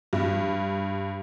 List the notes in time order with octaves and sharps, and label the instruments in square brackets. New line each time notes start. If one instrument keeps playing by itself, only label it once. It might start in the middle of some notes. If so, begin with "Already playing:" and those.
[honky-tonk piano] G2